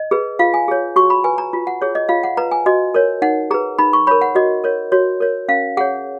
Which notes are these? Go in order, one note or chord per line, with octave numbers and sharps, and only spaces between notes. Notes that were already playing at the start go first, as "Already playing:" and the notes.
Already playing: D#5
G#4 B4
F4 F5
G#5
G#4 C#5
F#4 C#6
B5
B4 G#5
A#5
F4
F#5
G#4 C#5
D#5
F4 F5
F#5
B4 A#5
G#5
F#4 D#5
A#4 C#5
D#4 F#5
G#4 B4 A#5
D#4 B5
C#6
A#4 C#5 B5
F#5
F#4 D#5
A#4 C#5
F#4 C#5
A#4 C#5
C#4 F5
G#4 C#5 F#5